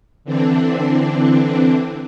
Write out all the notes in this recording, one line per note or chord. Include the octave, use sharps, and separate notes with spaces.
D3 E3 C4 D4